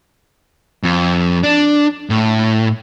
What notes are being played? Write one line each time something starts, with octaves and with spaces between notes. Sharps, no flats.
F2
D4
A2